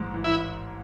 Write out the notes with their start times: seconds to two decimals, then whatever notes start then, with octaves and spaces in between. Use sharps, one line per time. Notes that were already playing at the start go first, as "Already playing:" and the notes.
Already playing: A1 G#2
0.14 E3
0.24 E4